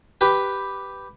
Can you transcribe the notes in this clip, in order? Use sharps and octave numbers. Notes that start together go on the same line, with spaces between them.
G4 B4